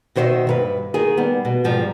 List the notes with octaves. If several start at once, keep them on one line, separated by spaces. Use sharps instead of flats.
B2 D#3 C5 C#5 D#5 E5
G2 A#4 B4
D#3 G#4
G3 B3
B2
G#2 F3 G3